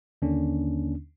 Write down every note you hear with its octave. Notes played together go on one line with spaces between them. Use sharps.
D#2 D3 A#3 C#4 D4